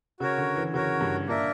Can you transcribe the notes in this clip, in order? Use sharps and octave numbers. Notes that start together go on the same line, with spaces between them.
C#3 F#4 A#4 C#5
D3
E3
C#3 F#4 A#4 C#5
G2
A#2 A#3 D4 A#4 E5